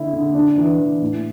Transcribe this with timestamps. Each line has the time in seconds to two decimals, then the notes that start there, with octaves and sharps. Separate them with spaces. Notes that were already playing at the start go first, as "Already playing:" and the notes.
Already playing: D3 E4
0.13 D3
0.35 D4
0.58 E3
0.79 E3
1.02 A2